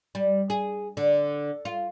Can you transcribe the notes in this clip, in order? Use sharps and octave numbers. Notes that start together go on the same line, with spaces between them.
G3
G#4
D3
F4